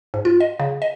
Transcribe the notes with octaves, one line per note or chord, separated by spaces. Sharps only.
G#2
F4
D#5
C#3
D#5